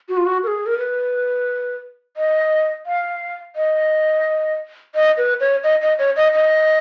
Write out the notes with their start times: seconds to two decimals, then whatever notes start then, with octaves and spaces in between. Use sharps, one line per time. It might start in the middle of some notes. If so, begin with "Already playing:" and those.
0.09 F#4
0.17 F4
0.26 F#4
0.43 A#4
0.47 G#4
0.66 A#4
0.78 B4
2.17 D#5
2.86 F5
3.56 D#5
4.95 D#5
5.18 B4
5.40 C#5
5.64 D#5
5.82 D#5
5.99 C#5
6.16 D#5
6.33 D#5